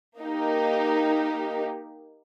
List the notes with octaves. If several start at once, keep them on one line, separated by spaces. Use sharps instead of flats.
A#3 D#4 G4